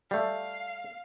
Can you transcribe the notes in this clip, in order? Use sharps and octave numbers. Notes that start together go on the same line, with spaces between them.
G3 A3 F5